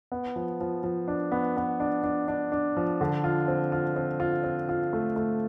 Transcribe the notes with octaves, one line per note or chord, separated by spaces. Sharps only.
B3
F3
F3
F3
D4
B3
B3
D4
D4
D4
D4
F3
D3
F4
C4
F4
C4
F4
C4
F4
A3
A3